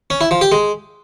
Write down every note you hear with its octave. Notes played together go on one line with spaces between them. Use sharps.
C#4
E4
F3
G4
G#3